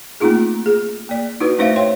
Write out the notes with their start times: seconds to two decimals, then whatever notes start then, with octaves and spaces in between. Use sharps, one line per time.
0.20 A3 A#3 C4 D#4 F4 G#4
0.66 G#4
1.09 A#3 D5
1.40 D#4 E4 F#4 B4
1.58 A3 C#4 D#4 C5 E5 F5
1.76 C#5 F5 G5 C6